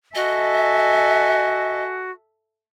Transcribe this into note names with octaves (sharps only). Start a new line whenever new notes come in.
F#4 A4 D#5 E5 G#5